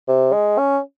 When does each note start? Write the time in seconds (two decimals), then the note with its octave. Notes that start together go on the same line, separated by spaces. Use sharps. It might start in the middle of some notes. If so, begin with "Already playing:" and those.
0.08 C3
0.33 G#3
0.58 C#4